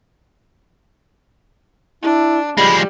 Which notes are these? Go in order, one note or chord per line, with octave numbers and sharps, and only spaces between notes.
D4 E4
F3 G3 G#3 B5